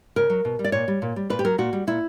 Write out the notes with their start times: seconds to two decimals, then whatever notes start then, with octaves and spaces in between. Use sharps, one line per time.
0.16 C#3 A#4
0.30 F#3
0.45 B2
0.59 G3
0.64 D5
0.72 A#2 C#5
0.88 G3
1.02 A#2
1.16 G3
1.30 A#2 B4
1.39 G4
1.44 F#3 A#4
1.58 A#2 F#4
1.73 G3
1.87 A#2 E4